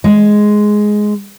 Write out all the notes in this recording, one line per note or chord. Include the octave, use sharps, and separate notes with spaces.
G#3